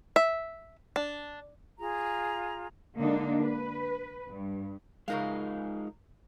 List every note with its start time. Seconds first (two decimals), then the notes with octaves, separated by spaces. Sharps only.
0.16 E5
0.96 D4
1.78 F4 G#4 A#5
2.97 D3 G#3 A#3 D4 D#4
3.43 B4
4.28 G2
5.08 C#3 G#3 D#4 F4 A#4 F5